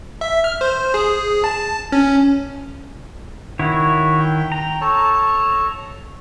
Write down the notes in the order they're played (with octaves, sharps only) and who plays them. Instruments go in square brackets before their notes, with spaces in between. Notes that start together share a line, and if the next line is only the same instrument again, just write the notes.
[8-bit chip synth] E5
F6
C5
G#4
A5
C#4
[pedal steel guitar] D#3 E4 C#5 [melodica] F#4
[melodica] G5
[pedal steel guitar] A#5
[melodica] A4 C#5 A5